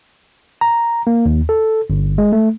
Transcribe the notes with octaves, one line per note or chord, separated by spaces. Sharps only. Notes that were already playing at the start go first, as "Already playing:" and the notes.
A#5
A#3
D#2
A4
G1
G#3
A3